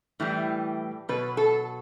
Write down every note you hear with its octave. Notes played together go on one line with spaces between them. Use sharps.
A2 E3 G3
B2 F#3 B4
A4